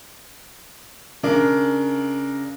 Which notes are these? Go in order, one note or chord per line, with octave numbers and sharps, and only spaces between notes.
C#3 D4 A#4